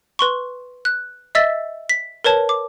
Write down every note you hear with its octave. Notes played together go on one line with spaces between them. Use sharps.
B4 C6 C#6
F#6
D#5 E5 E6 A6 B6
B6
A#4 B4 C#5 A5
D6